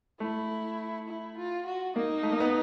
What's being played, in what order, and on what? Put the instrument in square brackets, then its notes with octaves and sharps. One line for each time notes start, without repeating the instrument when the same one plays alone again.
[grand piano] A3 [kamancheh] E4
[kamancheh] E4
F4
F#4
[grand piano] A#3 [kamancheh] D#4
[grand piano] A3
A#3
B3